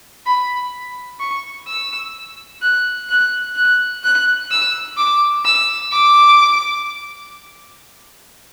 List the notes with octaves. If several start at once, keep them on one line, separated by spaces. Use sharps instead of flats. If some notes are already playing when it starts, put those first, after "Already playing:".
B5
C#6
E6
F#6
F#6
F#6
F#6
E6
D6
E6
D6